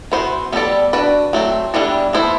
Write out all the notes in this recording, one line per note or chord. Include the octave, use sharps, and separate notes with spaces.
E3 B3 F#4 C5
G3 B3 F#4 A4 D5
D4 F#4 B4 D5
F#3 A3 C4
E3 G3 B3 D4 A4
B3 E4 A4 C5